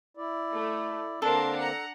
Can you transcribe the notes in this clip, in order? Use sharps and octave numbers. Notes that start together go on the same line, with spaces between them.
E4 D5
A3
D3 A#3 C4 D4 A4 A#4 C6
F#5 A#5